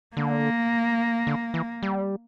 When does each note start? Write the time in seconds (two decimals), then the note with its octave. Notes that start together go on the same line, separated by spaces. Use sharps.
0.16 D3 A#3
1.27 D3
1.54 E3
1.83 G3